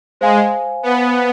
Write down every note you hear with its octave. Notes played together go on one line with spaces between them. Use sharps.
G#3 C5 F5 G#5
B3